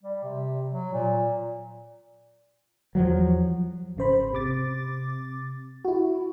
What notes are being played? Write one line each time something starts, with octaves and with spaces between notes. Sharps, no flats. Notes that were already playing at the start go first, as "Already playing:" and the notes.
G3
C3
F#3
A#2
E2 F3 F#3
G#1 C#3 C5 B5
C3 D6 A6
E4 F#4